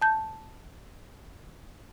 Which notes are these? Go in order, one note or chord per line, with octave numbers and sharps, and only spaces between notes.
A5 G6